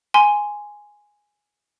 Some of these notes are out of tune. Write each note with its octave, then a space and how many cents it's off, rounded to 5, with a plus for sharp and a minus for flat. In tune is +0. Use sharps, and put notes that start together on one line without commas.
G#5 +0 C6 -10